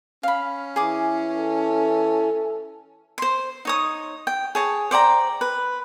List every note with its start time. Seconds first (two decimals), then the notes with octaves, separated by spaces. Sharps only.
0.23 C#4 F5 B5
0.76 E3 G#4 D6
1.35 A4
3.18 C5 C6
3.65 D#4 C#5 D#6
4.27 G5
4.55 G#4 C#5 A5
4.91 C5 D5 G5 A#5
5.41 B4